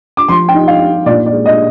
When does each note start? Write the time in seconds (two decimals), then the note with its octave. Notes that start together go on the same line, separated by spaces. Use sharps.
0.17 D6
0.28 F3 C6
0.48 G5
0.54 D#4
0.68 F5
0.81 D#4
1.06 A#2 D5
1.26 D5
1.33 G#3
1.46 D#5